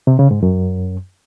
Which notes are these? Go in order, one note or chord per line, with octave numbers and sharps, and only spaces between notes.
C3
C#3
G#2
F#2